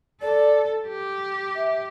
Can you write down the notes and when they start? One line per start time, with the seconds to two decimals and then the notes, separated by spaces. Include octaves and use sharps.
0.21 A4 D5
0.88 G4
1.55 E5